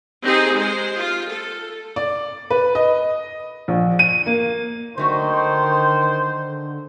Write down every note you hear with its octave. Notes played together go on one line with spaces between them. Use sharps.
C4 D#4 G4 G#4 C5
G#3 C5
F4
A4
D5
B4
D#5
A#1
D#7
A#3
D3 D#3 F#3 A3 F#4 C5